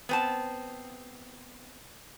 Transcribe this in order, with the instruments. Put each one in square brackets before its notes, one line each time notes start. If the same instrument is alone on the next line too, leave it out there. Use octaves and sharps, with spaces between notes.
[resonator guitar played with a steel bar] B3 C4 A5